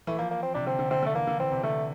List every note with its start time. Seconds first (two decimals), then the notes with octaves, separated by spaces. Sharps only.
0.07 E3 A3
0.18 F3 A#3
0.31 A#3
0.43 C4
0.54 C3 D4
0.66 D3 C4
0.79 D3
0.90 D3 C4
1.03 D3
1.06 A3
1.15 E3 A#3
1.27 D3
1.39 E3 C4
1.52 C3
1.63 D3 A3